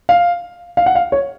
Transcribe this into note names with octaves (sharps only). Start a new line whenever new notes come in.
F5
F5
F#5
F5
C#5